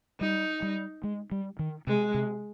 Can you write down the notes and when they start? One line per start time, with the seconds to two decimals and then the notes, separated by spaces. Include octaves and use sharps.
0.21 G3 D#4
0.62 G3
1.04 G#3
1.31 G3
1.59 D#3
1.87 C3 G#3
2.14 C3